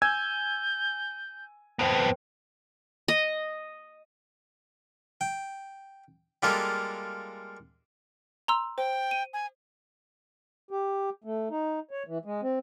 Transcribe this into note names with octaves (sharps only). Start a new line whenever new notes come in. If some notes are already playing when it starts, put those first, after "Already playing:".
G#5 E6 G6 G#6
F2 B3 B4 C5 G5
D#5
G5
G3 G#3 A#3 F4 G#4 A4
A#5 C6 E6
C5 G5
D#7
G#5
G4
A3
D#4
C#5
E3
G#3
C4